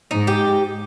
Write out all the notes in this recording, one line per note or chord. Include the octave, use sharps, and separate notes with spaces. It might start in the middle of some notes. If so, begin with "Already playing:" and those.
G#2 D#4
G4